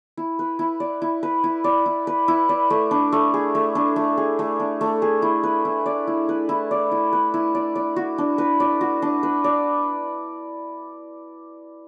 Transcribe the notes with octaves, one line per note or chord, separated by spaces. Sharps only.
E4
B4
E4
D5
E4
B4
E4
D5
E4
B4
E4
D5
A3
D4
A3
G#4
A3
D4
A3
G#4
A3
D4
A3
G#4
E4
B4
E4
D5
E4
B4
E4
D5
E4
B4
E4
D5
D5
F#4
D4
B4
D5
F#4
D4
B4
D5